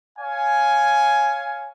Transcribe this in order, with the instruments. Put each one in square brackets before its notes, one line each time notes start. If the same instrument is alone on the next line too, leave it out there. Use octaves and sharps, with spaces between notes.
[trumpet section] C#5 F5 G#5